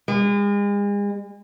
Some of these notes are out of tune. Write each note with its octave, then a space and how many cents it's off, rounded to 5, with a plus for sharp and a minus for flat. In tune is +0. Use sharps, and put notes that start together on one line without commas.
G#3 -40